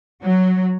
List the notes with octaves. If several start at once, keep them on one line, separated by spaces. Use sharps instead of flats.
F#3